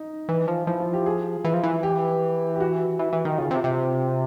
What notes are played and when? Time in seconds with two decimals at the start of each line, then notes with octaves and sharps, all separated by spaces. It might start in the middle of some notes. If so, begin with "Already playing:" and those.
Already playing: D#4
0.29 E3
0.48 F3
0.67 F3 E4
0.80 F4
0.93 G4
1.06 G#4
1.44 E3
1.54 F3
1.63 E3
1.83 G4
2.56 G4
2.60 F#4
2.99 E3
3.13 E3
3.25 D#3
3.38 C#3 F4
3.51 C3
3.64 C3